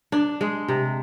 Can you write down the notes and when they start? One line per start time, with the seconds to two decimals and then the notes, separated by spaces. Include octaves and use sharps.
0.12 D4
0.41 G#3
0.68 C3